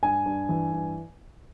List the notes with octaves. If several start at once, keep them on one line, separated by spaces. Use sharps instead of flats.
G2 G#5
G2
E3
G2